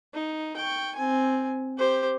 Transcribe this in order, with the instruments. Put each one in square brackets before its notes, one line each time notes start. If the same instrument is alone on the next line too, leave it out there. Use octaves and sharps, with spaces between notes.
[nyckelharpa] D#4
G5 C#6
C4 G#5
G4 C5